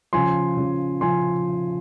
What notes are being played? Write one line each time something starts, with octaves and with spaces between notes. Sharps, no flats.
C#3 F3 G#5 C6
C#3 F3
C#3 F3 G#5 C6